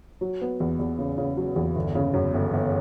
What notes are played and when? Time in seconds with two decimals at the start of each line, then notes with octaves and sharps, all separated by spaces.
0.21 F#3
0.42 B3
0.60 E2
0.79 E2
0.98 C#3
1.18 C#3
1.37 F#3
1.56 E2
1.76 G1
1.95 C#3
2.14 F#2
2.34 G1
2.53 G1